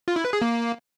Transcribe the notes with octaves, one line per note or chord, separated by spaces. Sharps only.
F4
E4
B4
G#4
A#3